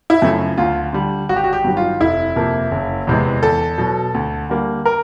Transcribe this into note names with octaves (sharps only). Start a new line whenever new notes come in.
E4
F#2 C#3 F3 A3
D2 F4
D3 G3
G#1 F#4
G4
F#4
G4
G2 D#3 F#3
F4
F1 E4
F2 C3 F3 A#3
F#1
E2 C3 E3 G#3
E2 A4
B2 F#3
D2
D3 G3 A#3
A#4